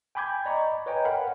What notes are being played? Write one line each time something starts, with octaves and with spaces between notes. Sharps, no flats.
G5 G#5 B5 D6 G6 G#6
D5 D#5 A#5 B5 C#6
B4 C#5 D#5 G5 G#5 A#5
A#4 F5 F#5 B5